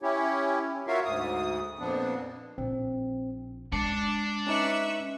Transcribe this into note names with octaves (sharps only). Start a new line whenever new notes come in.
C#4 E4 G4 C#5
F4 F#4 A#4 C#5 E5 F5
D2 G#2 D#6
F2 A#2 F3 B3 D4
A#1 C4
G#3 D4 C7 C#7
C#4 D#4 B4 E5 C#6 C#7